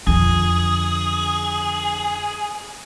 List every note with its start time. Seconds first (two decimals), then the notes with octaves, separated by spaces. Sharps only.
0.07 F2 D3 G#4